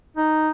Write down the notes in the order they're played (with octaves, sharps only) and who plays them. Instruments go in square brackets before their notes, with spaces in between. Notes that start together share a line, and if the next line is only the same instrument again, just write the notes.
[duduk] D#4